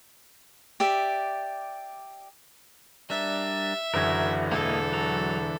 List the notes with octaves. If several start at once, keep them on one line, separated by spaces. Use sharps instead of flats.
G4 D5 E5
G3 D4 A#4 E5
F#1 F#2 D3 E3 F#4 A#4 G#6
E1 A#3 E4 A4 D#5
F#3 A#5